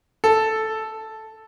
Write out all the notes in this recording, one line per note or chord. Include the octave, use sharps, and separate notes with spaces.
A4